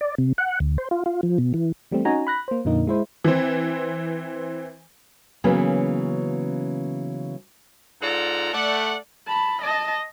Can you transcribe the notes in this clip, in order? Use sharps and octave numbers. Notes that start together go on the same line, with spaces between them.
D5
C3
F#5
D2
C5
F4
F4
F3
B2
E3
E3 G3 A3 C4
C#4 D#4 F#4 G#5 A#5
B5 F#6 A#6
A#3 C5
F2 A#2 D3 A#3 D#4
G#3 E4 C5
E3 C4
C#3 E3 F#3 A#3 B3 C#4
G#2 F4 A4 D5 F#5 A#5
A3 D5 F#5
A5 B5
D#5 A5